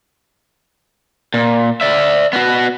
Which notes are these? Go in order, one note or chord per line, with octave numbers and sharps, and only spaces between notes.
A#2
D5 E5
B3 F#4